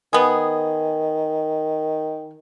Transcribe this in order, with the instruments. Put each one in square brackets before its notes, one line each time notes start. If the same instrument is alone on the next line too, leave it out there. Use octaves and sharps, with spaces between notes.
[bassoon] D#3 [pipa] B3 G#4